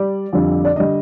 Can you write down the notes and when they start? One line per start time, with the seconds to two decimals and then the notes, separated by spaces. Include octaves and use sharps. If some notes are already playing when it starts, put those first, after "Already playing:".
Already playing: G3 D5
0.33 F2 D3 G3
0.65 D5
0.76 D3 G3 D#5